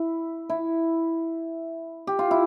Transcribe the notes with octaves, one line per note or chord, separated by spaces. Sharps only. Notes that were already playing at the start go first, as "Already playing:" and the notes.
Already playing: E4
E4
G4
F4
E4